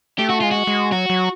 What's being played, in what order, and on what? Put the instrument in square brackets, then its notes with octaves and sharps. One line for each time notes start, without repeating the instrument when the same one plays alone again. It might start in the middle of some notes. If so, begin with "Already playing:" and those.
[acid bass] A3 [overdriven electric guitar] G4
[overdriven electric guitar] F#4
[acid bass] G#3 [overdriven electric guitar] F4
[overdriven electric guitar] F#4
[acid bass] G#3
[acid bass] F#3 [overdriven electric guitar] F#4
[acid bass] F#3